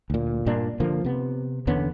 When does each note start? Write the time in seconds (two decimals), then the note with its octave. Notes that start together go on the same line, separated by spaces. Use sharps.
0.10 D2 A#2
0.46 G2 A#2 A#3 D4
0.80 D3 F3 A#3
1.05 C3 B3
1.67 E2 D3 B3 C#4